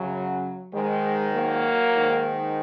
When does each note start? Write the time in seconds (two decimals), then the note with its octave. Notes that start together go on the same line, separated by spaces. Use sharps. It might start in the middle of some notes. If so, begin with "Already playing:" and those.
Already playing: F#2 C#3 F#3
0.73 G#2 D#3 G#3
1.32 F#3 A#3
1.92 G#2 D#3